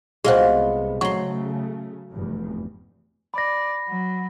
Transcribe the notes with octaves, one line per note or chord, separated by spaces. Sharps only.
C2 G#3 B3 F4 F#4 G#4 C5
C#3 F#3 A3 C6 C#6
F1 E2 G2
D5 B5 A#6
F#3